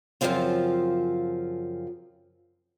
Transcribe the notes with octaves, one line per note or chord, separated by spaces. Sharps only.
F#2 A2 C#3 F3 C4 F4